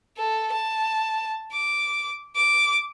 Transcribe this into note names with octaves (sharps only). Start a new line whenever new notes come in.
A4
A5
D6
D6